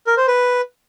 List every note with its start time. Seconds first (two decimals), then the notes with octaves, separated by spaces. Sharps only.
0.07 A#4
0.17 C5
0.27 B4